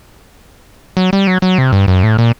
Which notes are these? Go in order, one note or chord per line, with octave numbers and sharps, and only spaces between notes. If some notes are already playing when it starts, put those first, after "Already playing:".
F#3
G3
F#3
F#3
C3
G2
F#2
A2
A#2